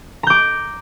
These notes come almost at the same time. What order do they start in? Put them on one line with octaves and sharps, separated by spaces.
A#5 G6 D6